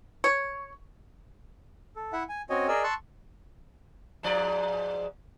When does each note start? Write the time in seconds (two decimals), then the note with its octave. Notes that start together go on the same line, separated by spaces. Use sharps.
0.24 C#5
1.96 A4
2.13 E4 E5 F#5
2.29 G#5
2.50 C4 C#4 F#4 C#5 D#5 G#5
2.68 G#4 A#4 D5 D#5 G#5 E6
2.84 A5 C6 C#6 E6 F#6
4.23 G#2 F3 D5